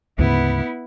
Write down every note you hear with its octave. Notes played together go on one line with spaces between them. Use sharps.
D2 G#2 C#3 B3 E4